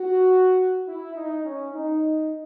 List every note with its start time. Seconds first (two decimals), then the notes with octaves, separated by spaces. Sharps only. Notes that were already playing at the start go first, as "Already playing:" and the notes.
Already playing: F#4
0.87 E4
1.16 D#4
1.45 C#4
1.74 D#4